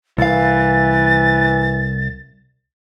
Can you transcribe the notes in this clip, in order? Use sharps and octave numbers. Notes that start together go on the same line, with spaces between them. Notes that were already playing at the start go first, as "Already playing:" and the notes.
C2 E3 F5 A6